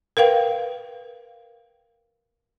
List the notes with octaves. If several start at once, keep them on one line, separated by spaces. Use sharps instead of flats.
A#4 B4 F5 G5